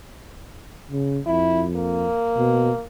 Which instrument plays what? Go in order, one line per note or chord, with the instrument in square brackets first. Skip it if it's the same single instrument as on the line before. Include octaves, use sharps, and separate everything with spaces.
[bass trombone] C#3
[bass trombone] F2 [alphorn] E4
[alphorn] A#3
[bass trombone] B2